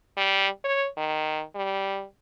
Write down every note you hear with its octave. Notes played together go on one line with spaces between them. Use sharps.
G3
C#5
D#3
G3